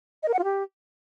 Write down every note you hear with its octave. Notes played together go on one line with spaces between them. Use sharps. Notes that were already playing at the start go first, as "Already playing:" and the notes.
D#5
A#4
F#5
F4
G4